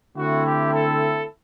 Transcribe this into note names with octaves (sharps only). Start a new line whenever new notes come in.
D3 A3 C4 E4 F#4
G4
A4